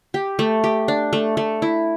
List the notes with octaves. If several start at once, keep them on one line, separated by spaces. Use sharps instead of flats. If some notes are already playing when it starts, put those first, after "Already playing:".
G4
A3
G4
D4
A3
A3
E4